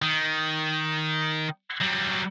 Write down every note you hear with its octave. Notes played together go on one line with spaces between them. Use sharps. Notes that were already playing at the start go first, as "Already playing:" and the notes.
D#3
F#3 G3